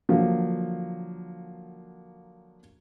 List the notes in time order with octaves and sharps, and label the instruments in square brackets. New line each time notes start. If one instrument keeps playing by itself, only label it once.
[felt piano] D3 F3 F#3 A#3